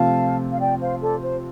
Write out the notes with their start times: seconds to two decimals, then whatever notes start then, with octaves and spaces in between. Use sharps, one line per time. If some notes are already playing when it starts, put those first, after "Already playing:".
Already playing: C3 F3 A3 C4 F4 F5 A5
0.49 F5
0.60 D5 G5
0.81 C5 F5
1.01 A4 D5
1.22 C5